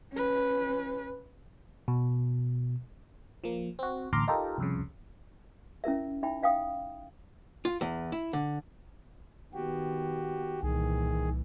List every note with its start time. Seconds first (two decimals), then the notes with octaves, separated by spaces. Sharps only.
0.13 C#4 B4
1.88 B2
3.44 F3 A#3
3.79 C4 F#4
4.13 A1 D2 A#5 C6 D6 F6
4.28 D#4 F4 G4 A4 A#4
4.58 C2 F2 C#3
5.84 C#4 E4 A#4 E5
6.23 D#4 E5 G5 B5
6.43 E5 F5 G5 D#6
7.65 F4
7.81 E2
8.12 E4
8.33 D3
9.53 D#3 B3 F#4 G4
10.63 C2 A#2 D#3 E3 G#4